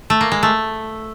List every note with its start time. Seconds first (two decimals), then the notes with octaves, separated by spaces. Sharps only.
0.10 A3
0.21 A#3
0.32 G#3
0.43 A3